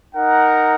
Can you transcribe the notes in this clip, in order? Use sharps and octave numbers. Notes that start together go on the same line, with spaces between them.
D#4 A#4 F#5